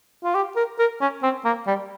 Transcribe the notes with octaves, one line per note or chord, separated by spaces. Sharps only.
F4
G4
A#4
A#4
C#4
C4
A#3
G3